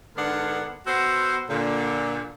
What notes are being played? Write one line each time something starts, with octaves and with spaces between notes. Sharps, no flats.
G#2 D3 B3 D4 A#4 F#5
B3 F#4 A4 C5
A#2 D3